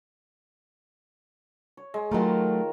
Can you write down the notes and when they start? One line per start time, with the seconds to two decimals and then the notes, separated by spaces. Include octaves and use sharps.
1.77 C#5
1.94 G#3
2.12 D#3 F#3 A3 F4 A#4